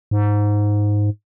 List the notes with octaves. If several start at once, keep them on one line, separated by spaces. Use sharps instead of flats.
G#2